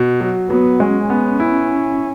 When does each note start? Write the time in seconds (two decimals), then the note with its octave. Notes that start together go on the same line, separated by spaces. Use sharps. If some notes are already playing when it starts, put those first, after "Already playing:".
Already playing: B2
0.21 F#3
0.50 F#3 B3
0.80 G#3 C#4
1.10 B3
1.40 E4